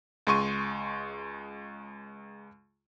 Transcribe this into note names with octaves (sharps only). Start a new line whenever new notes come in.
C#2 G#3 C6 C#6 D#7